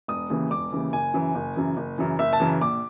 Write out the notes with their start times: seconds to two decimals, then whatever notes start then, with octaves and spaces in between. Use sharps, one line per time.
0.08 E1 D#6
0.30 D#2 C#3 E3
0.50 E1 D6
0.72 D#2 C#3 E3
0.93 F#1 G#5
1.14 F#2 C#3 E3
1.35 F#1
1.56 F#2 C#3 E3
1.77 F#1
1.98 F#2 C#3 E3
2.19 F#1 E5
2.33 A5
2.40 F#2 C#3 E3
2.61 A#1 D6